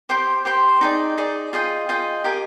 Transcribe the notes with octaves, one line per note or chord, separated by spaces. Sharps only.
G4 C5 G5 C6
G4 C5 G5 C6
D#4 G#4 D5
D#4 G#4 D5
F4 G#4 D#5 G5
F4 G#4 D#5 G5
G4 A#4 D#5 G#5